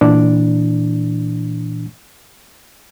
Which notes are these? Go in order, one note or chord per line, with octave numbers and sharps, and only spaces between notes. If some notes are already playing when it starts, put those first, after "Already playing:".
A#2 E3 D4